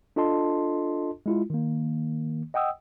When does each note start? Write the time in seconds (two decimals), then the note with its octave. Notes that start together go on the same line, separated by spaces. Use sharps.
0.16 D4 F4 A4 D#5 A5 C6
1.26 G#3 E4 F4
1.50 D#3 A#3
2.54 D#5 F#5 G5 D#6 E6